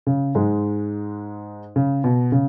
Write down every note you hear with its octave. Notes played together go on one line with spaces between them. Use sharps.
C#3
G#2 G#3
C#3
B2
C#3